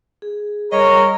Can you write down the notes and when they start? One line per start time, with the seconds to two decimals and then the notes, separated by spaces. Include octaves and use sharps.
0.22 G#4
0.72 G3 G#4 A#4 C#5 D#5